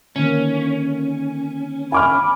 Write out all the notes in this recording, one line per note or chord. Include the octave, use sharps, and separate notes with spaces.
D3 D#3 A#3 C#4
G#5 B5 D6 F6